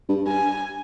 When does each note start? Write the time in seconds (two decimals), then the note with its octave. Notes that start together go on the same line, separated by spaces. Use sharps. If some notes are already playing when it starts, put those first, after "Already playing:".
0.09 G2
0.26 G2 G#5